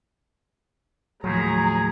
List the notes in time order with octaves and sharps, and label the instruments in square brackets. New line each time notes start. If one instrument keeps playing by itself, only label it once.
[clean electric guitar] D#2 A2 F3 [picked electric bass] F#3 [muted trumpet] G#4 [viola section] A#5